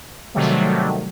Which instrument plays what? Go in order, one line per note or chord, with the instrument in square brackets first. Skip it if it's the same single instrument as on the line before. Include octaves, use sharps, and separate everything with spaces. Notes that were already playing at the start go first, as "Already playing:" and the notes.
[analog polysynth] C3 D#3 F#3 G3 A3